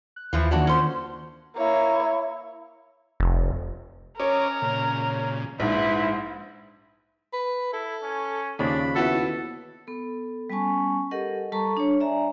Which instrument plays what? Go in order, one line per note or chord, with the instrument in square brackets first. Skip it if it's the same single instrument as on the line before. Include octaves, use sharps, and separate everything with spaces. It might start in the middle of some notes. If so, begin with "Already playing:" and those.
[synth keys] F#6
[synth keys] D#2 [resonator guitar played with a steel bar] E3 F3 E4
[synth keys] D#3 A#3 F4 [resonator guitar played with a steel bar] F#3 D4 F#4
[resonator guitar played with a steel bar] C#4 C5
[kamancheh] A#3 C#5 [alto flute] E4
[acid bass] F1
[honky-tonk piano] C#4 [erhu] A#4 [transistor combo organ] C#5 D#5 D6
[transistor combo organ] A#2 C#3
[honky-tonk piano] A#1 G#2 [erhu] E4 [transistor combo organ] B4
[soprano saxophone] B4
[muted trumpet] E4 [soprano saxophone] A4
[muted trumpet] C#4
[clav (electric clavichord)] D#2 C#3 F3 [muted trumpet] D4 [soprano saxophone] B5
[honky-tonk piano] B3 E4 F#4 [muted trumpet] A4
[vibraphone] B3 A4
G3 B3 C#4 G#5 A5 C#6
G4 A4 A#4 D#5 F#5
G3 A4 A5 A#5 C#6
D4 C#5
D5 E5 G#5 A#5